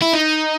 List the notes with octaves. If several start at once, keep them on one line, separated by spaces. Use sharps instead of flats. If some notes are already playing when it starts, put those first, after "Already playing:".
E4
D#4